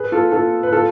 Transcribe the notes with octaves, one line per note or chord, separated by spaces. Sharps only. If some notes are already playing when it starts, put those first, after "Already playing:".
Already playing: G#4 B4
F4 A4
F4 A4
B4
F4 A4